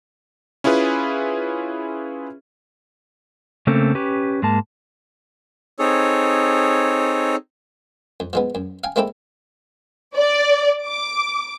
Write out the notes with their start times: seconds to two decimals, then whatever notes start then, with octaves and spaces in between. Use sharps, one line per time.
0.64 C#4 E4 F4 G#4 B4
3.67 C#3 A3 A#3 C4 C#4 A4
3.95 C#4 G4 B4
4.42 G#2 G#3 A#3 A5
5.79 C4 D#4 G#4 A4 C#5
8.20 F2
8.33 F3 G#3 B3
8.55 F#2
8.84 F5 G5 G#5
8.96 G#3 A#3 C4 E4 A4 G5
10.16 D5
10.85 D6